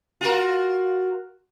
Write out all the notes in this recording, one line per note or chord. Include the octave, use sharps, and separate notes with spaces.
F4 F#4 A#4